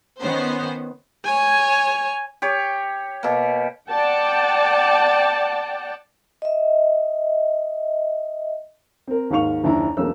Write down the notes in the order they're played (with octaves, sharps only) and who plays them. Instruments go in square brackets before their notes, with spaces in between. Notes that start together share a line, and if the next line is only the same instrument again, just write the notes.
[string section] D#3 B3 C#4 C5
[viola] C#5 G#5
[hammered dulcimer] G4 C#5
B2 A#3
[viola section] D5 F#5 G5 A5
[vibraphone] D#5 E5
[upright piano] C4 A#4
D#2 G#2 A#3 F5 C#6 F7
F#1 D#2 D4 E4 A#5
E1 B1 A#3 C#4 E6